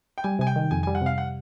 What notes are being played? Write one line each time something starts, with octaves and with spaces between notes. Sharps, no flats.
G5
G3 G#5
C3 G#5
G5
D#3
F2 G#5
G3 G#5
F#5
C3 F5
F#5